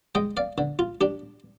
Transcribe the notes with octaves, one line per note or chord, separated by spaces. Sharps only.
G#3 D#5 G5
D5 F5
D3
F4
D4 G4